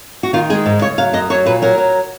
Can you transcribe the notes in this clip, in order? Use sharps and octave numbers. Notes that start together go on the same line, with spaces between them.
F#4
D#3 F4
G#3 G#4
G#2
C#3 C#5
F#3 F5
F#2 D#5
F#3 C#5
A#2 B4
F#3 A#4
F#3